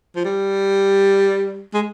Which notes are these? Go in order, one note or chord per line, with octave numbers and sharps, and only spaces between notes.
F3
G3
G#3